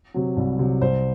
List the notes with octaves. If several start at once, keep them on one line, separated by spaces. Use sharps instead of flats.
C3 F#3
C2
C3 F#3
C2 C5